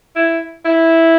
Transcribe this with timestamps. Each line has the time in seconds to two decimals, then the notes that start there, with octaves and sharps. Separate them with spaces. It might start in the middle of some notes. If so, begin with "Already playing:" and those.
0.16 E4
0.65 E4